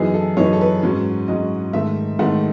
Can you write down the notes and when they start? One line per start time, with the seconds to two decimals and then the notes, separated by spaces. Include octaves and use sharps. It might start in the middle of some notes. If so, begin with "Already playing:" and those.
Already playing: F#2 E3 B3 D#4 G#4
0.14 A4
0.37 F#2 E3 B3 D#4 C#5
0.45 B4
0.53 A4
0.61 B4
0.83 G#2 F#3 C#4
1.28 G#2 F#3 C#4 D#5
1.73 G#2 D#3 A3 E5
2.19 G#2 D#3 A3 F#5